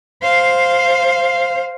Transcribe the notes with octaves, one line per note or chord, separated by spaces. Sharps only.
C5 F5